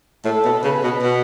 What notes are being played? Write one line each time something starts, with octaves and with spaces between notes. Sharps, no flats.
A2 A4
B2
C#3 B4
B2
B2